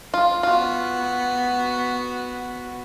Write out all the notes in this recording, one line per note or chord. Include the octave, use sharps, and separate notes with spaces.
F4
B3 F4 F#4